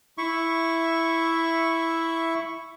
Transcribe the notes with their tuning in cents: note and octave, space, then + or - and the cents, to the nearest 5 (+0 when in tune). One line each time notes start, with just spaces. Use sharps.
E4 +0 E5 +0 C#6 +0